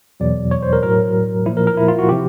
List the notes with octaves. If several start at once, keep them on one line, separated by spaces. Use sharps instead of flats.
E2 B2 F#3 D5
C#5
C5
A#4
A2 F#3 A#4
A#2 F3 E4
A#4
A#4
E4
F4
F#4
C3 F3 G4